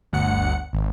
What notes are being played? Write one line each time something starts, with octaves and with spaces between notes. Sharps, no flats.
G1 D2 F#5 C#7
G#1